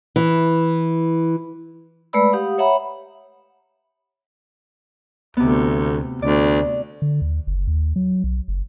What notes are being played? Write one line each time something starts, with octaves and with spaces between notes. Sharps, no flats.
E3
G#3 A3 B4 D5 B5 E6
G4 F5 F#5 D#6
C#5 E5 F#5 A#5 B5
D2 C3 B3
D2 D5
D3
D#2
F#1
D#2
F#3
B1
F#1